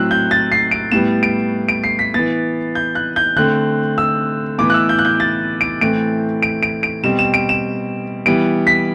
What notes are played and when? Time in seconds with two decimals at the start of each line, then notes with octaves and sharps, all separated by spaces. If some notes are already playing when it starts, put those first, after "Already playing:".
Already playing: A2 F#3 C4 E6 F#6
0.11 G6
0.31 A6
0.52 C7
0.71 D7
0.92 A2 G3 B3 E7
1.23 D7
1.69 D7
1.84 C7
1.99 B6
2.14 E3 B3 A6
2.75 G6
2.95 F#6
3.16 G6
3.36 D3 A3 C4 F#6
3.98 E6
4.58 A2 E3 B3 D6
4.70 F#6
4.74 E6
4.89 G6
4.99 F#6
5.05 G6
5.20 A6
5.61 D7
5.81 A2 E3 A3 C4 D7
6.43 D7
6.63 D7
6.83 D7
7.03 B2 G3 C4 E7
7.19 E7
7.34 D7
7.49 E7
8.26 E3 G3 B3 D7
8.67 B6